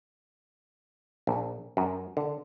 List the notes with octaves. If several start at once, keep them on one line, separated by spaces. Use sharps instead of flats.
A#1
F#2
D3